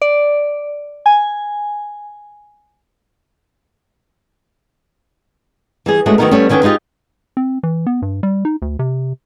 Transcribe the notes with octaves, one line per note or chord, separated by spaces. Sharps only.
D5
G#5
E3 G3 G#4
G#3 A3 C#4 F#4
D#3 F#3 A3 B3 D#4 A#4
G3 A3 B3 C#4
D3 D#3 C#4 B4 G5
G#3 D#4 F4 G4
C4
E3
B3
G2
G3
D#4
D2
C3